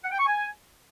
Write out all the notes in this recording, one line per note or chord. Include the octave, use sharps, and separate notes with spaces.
F#5
G5
C#6
G#5